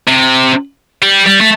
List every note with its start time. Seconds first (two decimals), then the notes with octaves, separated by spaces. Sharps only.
0.08 C3
1.02 G3
1.27 G3
1.41 A3